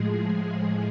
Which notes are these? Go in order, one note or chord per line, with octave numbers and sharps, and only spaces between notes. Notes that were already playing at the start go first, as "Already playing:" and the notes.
Already playing: A2 F3 G#3 G#4